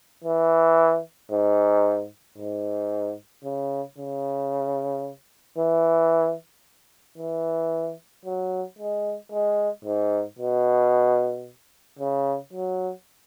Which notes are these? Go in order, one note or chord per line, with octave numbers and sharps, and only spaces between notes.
E3
G#2
G#2
C#3
C#3
E3
E3
F#3
G#3
G#3
G#2
B2
C#3
F#3